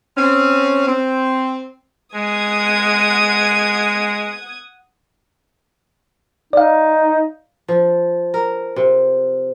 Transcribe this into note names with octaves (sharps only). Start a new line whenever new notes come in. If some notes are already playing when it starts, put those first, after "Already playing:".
C4 C#4
C4
G#3 F#5 D#6 G#6
D#4 D5 F5
F3
A#4
C3